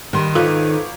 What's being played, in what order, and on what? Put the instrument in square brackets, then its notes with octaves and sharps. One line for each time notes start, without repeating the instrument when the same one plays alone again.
[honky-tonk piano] G2 G3 C6 [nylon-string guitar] D#3
[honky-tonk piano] G#1 F5 D6 [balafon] F4 [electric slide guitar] A4 B4